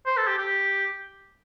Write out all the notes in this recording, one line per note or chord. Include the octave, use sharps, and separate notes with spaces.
C5
A4
G4
G4